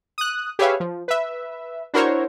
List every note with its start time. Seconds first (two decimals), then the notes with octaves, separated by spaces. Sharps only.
0.18 D#6 F#6
0.59 G4 G#4 B4 C#5 E5 F5
0.80 F3
1.08 B4 E5
1.94 D4 E4 F#4 A#4 C5 C#5